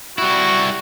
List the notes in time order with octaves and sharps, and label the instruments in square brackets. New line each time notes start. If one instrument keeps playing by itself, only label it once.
[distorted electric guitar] G3 E4 [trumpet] F#4